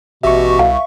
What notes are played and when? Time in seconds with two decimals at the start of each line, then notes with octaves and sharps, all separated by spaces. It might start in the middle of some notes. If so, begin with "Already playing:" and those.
0.23 A1 B2 F#4 G4 E5 C#6
0.59 C2 F5